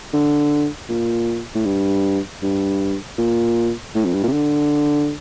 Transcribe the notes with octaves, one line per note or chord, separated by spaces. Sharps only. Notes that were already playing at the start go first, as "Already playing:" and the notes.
D3
A#2
A2
G2
G2
A#2
A2
F2
G2
A#2
C3
D3